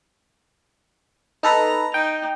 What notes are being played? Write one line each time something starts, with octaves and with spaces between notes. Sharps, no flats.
D#4 A4 B4 A#5
D#4 G5